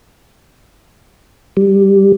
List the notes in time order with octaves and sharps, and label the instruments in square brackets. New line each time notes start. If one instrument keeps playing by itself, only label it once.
[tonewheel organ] G3